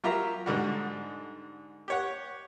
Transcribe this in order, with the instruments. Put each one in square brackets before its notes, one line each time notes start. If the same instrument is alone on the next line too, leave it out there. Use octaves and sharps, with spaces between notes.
[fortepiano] F#3 F4 G4 A#4 E5 A#5
G#2 D3 G3 F#4
G4 C#5 F#5